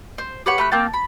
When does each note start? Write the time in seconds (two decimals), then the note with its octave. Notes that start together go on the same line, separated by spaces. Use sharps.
0.18 C5
0.46 G4 B4 C#5 F#5
0.58 A3 B5 F#6
0.72 A#3 C4 G5 A5
0.94 B5